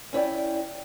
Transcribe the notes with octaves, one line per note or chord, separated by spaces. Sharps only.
C#4 E4 D5 G5